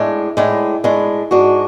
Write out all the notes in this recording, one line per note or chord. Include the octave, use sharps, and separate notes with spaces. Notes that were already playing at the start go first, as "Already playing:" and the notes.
Already playing: A2 G#3 D4
A2 G#3 D4
A2 G#3 D4
G#2 G#3 D4 F#4